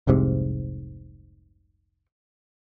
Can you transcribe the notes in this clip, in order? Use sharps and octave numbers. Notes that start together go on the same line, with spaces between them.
F1 C2 G#2 C3